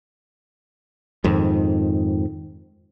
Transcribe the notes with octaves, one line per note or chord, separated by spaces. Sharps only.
F2 G#2 D#3